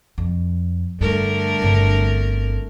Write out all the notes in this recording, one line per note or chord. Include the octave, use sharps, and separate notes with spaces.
F2
G2 D3 A3 A#4
G1 C4